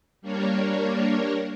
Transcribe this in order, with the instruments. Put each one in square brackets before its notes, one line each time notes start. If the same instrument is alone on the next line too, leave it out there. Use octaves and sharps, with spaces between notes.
[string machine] G3 A#3 D4 A#4 C#5